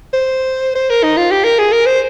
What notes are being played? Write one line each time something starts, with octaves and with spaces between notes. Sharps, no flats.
C5
C5
A#4
D#4
F4
G4
A#4
G#4
A#4
C5